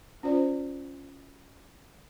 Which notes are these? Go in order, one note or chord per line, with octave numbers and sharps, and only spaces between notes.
C#4 F4 C5 D5